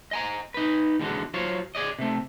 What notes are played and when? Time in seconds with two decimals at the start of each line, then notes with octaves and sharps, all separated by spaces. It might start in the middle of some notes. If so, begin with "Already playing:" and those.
0.11 D#5 G#5 A#5
0.54 D#4 B4
1.00 E2 D3 G#3 F#4
1.34 F#3 F4 C5 C#5
1.75 G#4 D5 D#5
1.99 C3 A3